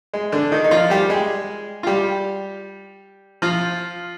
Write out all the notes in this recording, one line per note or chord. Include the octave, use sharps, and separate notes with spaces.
G#3
D3 D4
D#3 D#4
D#4
F3 F4
G3 G4
G#3 G#4
F4
G3 G4
F3 F4